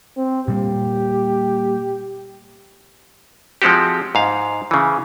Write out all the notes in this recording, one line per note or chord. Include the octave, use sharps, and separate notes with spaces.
C4
A#2 G3 A#3 G4
F3 G#3 C4 F#4 G4
G#2 F5
C#3 E3